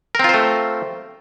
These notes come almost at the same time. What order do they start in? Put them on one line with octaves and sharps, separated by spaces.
A#4 C4 F4 C5 A3